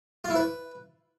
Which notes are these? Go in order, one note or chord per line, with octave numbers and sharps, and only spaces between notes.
F4
E4
B4